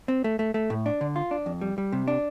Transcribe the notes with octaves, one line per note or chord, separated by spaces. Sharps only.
C4
A3
A3
A3
A2
D4
D3
F4
D4
F2
G3
G3
C3
D4